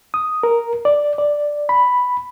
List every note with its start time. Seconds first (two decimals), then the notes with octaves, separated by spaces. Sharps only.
0.14 D#6
0.43 A#4
0.85 D5
1.18 D5
1.69 B5